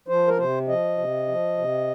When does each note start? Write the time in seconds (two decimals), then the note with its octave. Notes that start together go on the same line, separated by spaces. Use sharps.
0.08 F3 C5
0.28 A#4
0.38 C3 C5
0.68 F3 D#5
0.98 C3
1.28 F3
1.58 C3